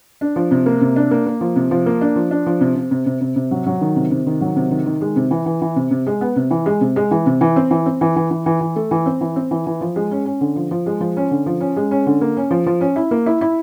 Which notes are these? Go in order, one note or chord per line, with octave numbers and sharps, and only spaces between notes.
D4
F3
C3
A#3
C3
D4
A#3
A#3
F3
C3
F3
A#3
D4
F3
D4
F3
C3
C3
C3
C3
C3
C3
F#3
F#3
D#3
C3
C3
D#3
F#3
C3
D#3
D#3
G#3
C3
E3
E3
E3
C3
C3
G#3
B3
C3
E3
G#3
C3
G#3
E3
C3
E3
C4
E3
C4
E3
E3
E3
E3
E3
A3
E3
C4
E3
C4
E3
E3
F3
G#3
C#4
C#4
D3
F3
F3
G#3
F3
C#4
D3
F3
C#4
G#3
C#4
D3
A#3
C#4
F3
F3
C#4
E4
A#3
E4
E4